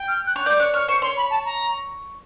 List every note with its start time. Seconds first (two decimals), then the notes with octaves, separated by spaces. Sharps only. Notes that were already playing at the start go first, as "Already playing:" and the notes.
Already playing: G5
0.08 F6
0.27 F#6
0.36 C#5
0.45 D5 G6
0.59 C#5 F#6
0.74 C#5 F6
0.88 C5 C#6
1.02 C#5 C6
1.17 B5
1.31 A5
1.45 A#5